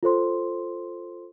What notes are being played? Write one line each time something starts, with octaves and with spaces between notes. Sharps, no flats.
F4 A4 C5 C6